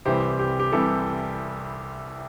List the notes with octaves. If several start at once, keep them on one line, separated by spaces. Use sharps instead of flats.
C2 C3 E3 G3 G4 C5
G4
G4
C2 C3 E3 G3 A4